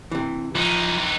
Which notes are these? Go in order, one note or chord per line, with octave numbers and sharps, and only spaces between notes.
C3 E3
E3 F3 D#4